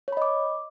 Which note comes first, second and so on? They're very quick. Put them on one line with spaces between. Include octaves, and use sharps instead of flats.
C#5 B5 D#5 D6